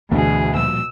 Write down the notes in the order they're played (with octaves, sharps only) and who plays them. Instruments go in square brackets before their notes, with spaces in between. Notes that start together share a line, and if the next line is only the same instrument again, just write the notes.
[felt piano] D2 D3 [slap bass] G2 E3 [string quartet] B2 G#4
[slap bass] A#2 F3 G3 [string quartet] E6